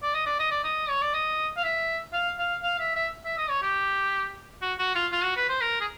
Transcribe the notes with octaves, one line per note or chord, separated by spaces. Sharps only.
D5
D#5
D5
D#5
D5
D#5
C#5
D5
D#5
F5
E5
F5
F5
F5
E5
E5
E5
D#5
C#5
G4
F#4
F#4
F4
F4
F#4
B4
C5
A#4
G#4